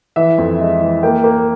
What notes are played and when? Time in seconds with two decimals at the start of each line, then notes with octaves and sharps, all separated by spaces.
0.16 E3 E5
0.38 F2
0.60 G#3
0.81 E3
1.03 A#3 G5
1.24 A#3